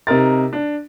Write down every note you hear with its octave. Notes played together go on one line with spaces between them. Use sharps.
C3 D#4 A#4 A6
D4